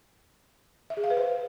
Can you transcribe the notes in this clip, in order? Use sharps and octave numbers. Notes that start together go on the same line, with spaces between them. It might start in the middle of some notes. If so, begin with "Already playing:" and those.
E5
G#4
F5
B4
C5